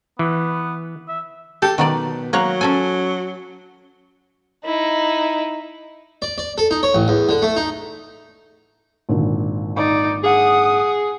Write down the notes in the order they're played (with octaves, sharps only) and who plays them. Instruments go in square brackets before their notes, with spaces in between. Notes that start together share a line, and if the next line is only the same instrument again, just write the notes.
[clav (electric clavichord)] E3 [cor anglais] B3
[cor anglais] E5
[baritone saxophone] G4 [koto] A4
[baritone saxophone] B2 [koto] D#3 F#3 D5
[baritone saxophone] F#3 [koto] A#3 C#5 F#5
[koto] C#4 A4 G#5
[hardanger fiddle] D#4 E4
[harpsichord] D5
D5
A4
D#4
C#5
A1
E2
D3
A3
D#4
[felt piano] G#1 A#2 D3
[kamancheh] D#4 D5
[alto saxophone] G#4 [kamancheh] F#5 D#6